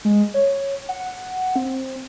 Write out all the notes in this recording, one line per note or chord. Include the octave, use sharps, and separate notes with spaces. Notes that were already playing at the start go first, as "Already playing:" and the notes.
G#3
C#5
F#5
C4